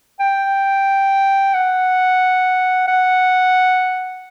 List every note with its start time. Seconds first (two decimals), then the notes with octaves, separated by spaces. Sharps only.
0.20 G5
1.54 F#5
2.88 F#5